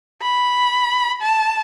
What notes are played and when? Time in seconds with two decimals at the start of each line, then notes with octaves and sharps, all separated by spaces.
0.22 B5
1.22 A5